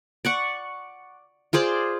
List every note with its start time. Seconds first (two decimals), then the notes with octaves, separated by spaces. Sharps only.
0.25 D5 F#5 C#6
1.53 F4 G#4 C5 D5